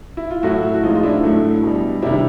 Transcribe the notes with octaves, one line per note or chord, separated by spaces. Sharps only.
E4
F4
A2 F#3 A3 E4 F#4
F#4
A2 F3 G#3 D#4 F4
F4
D4 E4
A2 F#3 A3
B2 G3
C3 D#3 G3 D4 E4